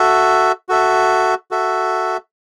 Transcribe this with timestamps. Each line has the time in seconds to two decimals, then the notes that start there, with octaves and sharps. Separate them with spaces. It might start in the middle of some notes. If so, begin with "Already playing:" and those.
Already playing: F#4 A4 E5
0.69 F#4 A4 E5
1.51 F#4 A4 E5